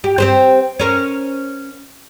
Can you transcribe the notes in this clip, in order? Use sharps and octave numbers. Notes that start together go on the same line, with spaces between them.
G4
C4 G4 C5
C#4 A#4 C5